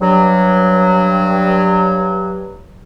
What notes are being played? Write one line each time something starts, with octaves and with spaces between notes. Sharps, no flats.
G2 F#3